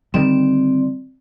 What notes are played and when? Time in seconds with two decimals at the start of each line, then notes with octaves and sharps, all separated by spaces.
0.14 D3 D#3 G3 C4 D5